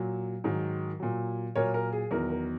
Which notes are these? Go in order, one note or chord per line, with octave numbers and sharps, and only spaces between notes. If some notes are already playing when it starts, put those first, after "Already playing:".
Already playing: A#2 F#3
G#2 D#3 F#3
A#2 F#3
A#2 F#3 A#4 C#5
A#4
G#4
E2 D#3 F#3 A#4
A#4